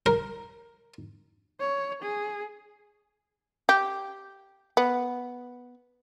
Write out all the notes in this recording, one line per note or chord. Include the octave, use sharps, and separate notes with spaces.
A#4
C#5
G#4
G4
B3